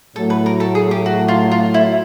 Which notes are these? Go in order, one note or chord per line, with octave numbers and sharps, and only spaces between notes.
A2 F#3 A3 A4
B4
A#4
A4
G#4
G4
F#4
F4
F4
E4